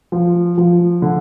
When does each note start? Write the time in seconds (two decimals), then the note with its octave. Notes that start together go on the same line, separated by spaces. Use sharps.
0.12 F3
0.58 F3
1.02 D3